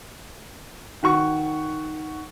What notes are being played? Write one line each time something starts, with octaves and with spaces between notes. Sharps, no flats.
D#3 F#4 C#6